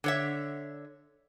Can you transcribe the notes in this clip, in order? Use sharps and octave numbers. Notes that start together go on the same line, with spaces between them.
D3 C#5 E5